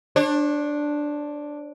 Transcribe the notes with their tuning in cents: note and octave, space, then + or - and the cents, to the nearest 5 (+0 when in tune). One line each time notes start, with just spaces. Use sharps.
D4 +0 C#5 -45